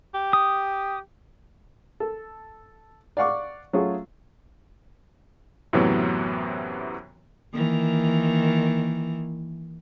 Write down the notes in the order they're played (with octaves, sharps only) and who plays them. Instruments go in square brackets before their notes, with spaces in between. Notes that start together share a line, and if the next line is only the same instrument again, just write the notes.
[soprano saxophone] G4
[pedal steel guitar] D#6
[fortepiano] A4
D5 F5 F#5 C#6 D6
F#3 A3 C#4 F4 F#4 G#4
[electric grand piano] F#2 A2 C3 E3 F#3 B3
[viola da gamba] D#3 E3 A#3